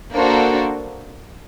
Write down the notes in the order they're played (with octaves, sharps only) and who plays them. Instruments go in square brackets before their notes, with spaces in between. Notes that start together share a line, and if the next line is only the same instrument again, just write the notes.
[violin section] A#3 D4 F#4 A4 C5